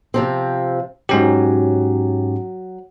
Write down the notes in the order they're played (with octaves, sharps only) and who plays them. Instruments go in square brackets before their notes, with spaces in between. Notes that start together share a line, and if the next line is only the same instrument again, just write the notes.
[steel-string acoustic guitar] C3 F3 C4
[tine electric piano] G#2 C#4 G4 [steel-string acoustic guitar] F#3